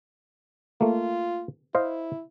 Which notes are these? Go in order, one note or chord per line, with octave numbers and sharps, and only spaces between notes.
A3 A#3 F4
E4 C5 D#5 F5